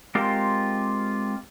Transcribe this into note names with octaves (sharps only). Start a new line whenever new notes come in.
G#3 C4 F4 G4 A#4